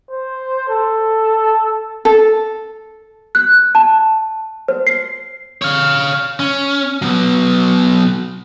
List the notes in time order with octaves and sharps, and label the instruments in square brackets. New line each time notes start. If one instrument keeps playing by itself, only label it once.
[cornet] C5
A4
[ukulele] A4
[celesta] F#6
A5
C5
C7
[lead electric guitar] C#5 F5
C#4
F#3 B3